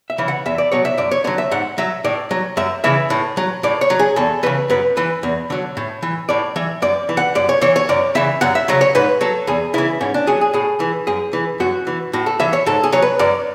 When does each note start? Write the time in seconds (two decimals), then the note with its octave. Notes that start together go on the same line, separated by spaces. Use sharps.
0.10 E5
0.18 C#3 E3
0.28 F#5
0.46 E2 E5
0.58 D5
0.72 B2 F#3 C#5
0.85 E5
0.98 F#2 D5
1.11 C#5
1.24 D3 F#3 C#5
1.38 E5
1.51 G#2 F#5
1.78 F#3 E5
2.04 A2 D5
2.31 F#3
2.57 F#2 E5
2.84 C#3 E3 E5
3.10 A2
3.37 F#3
3.63 A2 D5
3.81 C#5
3.90 F#3
3.99 G#4
4.16 E2 A4
4.43 C#3 E3 B4
4.70 F#2 B4
4.97 E3 B4
5.23 E2
5.50 D3 F#3
5.77 A2
6.03 E3
6.29 A2 D5
6.56 E3 E5
6.82 F#2 D5
7.09 E3
7.17 F#5
7.35 F#2 D5
7.49 C#5
7.61 E3 C#5
7.76 C#5
7.89 F#2 D5
8.15 C#3 E3 E5
8.41 F#2 F#5
8.55 E5
8.68 C#3 F#3 C#5
8.81 C#5
8.95 G#2 B4
9.21 F#3 A4
9.47 E2 G#4
9.74 C#3 E3 E4
10.01 G#2 C#4
10.14 D4
10.27 F#3 G#4
10.41 G#4
10.54 A2 G#4
10.80 E3
11.07 F#2 G#4
11.33 E3
11.60 F#2 F#4
11.87 E3
12.13 A2 F#4
12.26 A4
12.40 E3 E5
12.53 C#5
12.66 G#2 A4
12.83 G#4
12.92 F#3 C#5
13.02 B4
13.19 F#2 D5